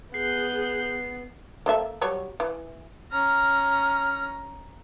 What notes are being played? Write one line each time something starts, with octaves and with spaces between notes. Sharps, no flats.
B3 G#4 F#6 G6 C7
A#3 A4 E5
F#3 G3 C#5
E3
C#4 A#5 F6